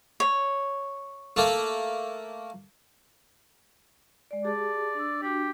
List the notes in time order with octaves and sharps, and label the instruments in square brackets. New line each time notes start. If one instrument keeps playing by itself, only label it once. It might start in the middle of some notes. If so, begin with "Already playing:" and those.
[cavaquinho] C#5
[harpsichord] A3 A#3
[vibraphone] G#3 D5
[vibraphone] G4 G#4 A5 [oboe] D5
[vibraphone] D4 E6
[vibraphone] D4 F#4 [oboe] G4